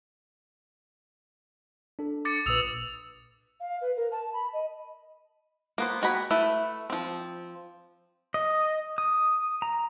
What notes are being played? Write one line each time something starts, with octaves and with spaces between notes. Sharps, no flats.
D4 A4
D6 A6 C#7
A#1 A#2 B4 D#6 E6 F7
F5
B4
A#4
A5
B5
D#5
A#3 B3 C5
F#4 G5 G#5 A#5 B5
A3 E4 B4 E5
F3 C4
D#5
D#6
A#5